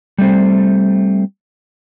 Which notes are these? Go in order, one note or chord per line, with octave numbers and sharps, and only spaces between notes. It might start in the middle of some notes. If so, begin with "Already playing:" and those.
G3 A3 C4 C5